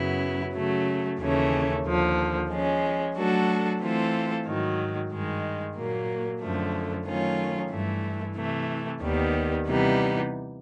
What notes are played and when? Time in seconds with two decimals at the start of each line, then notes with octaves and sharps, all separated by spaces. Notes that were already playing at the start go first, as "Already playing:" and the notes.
Already playing: F#2 C#3 F#3 B3 E4
0.55 C#3 F#3 A3
1.19 D#2 C#3 E3 A3 C#4
1.85 D#2 D3 F3
2.50 F3 G#3 C#4
3.15 F#3 A3 D4 F#4 A4
3.80 E3 A3 C4 F4 A4
4.46 G#2 D#3 F#3
5.11 G2 D#3 G#3
5.75 A#2 F#3 A#3
6.40 F#2 D3 F3 A3
7.06 D#3 F#3 A3 C#4 F4
7.70 G2 E3 A3
8.36 C3 E3 A3
9.02 D#2 D#3 G3 B3
9.66 C3 E3 G3 B3 D#4